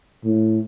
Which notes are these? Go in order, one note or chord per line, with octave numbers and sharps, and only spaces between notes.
A2